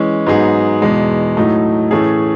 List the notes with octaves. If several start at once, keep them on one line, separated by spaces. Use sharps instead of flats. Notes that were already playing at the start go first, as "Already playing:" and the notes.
Already playing: E3 G#3 C#4
G#2 F#3 B3 D#4 G#4
E2 B2 G#3
A2 F#3 A3 D#4
A2 E3 A3 C#4 G#4